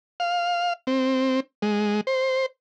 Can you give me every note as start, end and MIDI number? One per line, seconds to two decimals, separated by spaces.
0.20 0.73 77
0.87 1.40 60
1.62 2.01 56
2.07 2.46 72